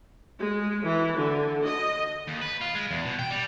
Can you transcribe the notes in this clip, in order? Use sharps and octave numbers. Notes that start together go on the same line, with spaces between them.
G#3
E3
D3
D#5
D#2
B4
F4
G#3
E2
B2
G5
G3